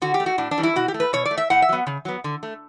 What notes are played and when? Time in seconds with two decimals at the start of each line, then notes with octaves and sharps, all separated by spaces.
0.02 D3 F#4
0.14 G4
0.20 A3
0.26 F#4
0.38 A2 D4
0.51 D4
0.58 E3 G3
0.63 E4
0.76 B2 F#4
0.88 G4
0.94 A3
1.00 B4
1.13 B2 C#5
1.25 D5
1.31 A3
1.38 E5
1.50 A2 F#5
1.62 E5
1.69 F#3 B3
1.87 C#3
2.05 F#3 B3
2.24 D3
2.43 A3